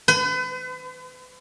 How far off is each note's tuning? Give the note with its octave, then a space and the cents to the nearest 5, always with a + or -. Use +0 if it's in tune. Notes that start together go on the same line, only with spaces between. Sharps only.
B4 +40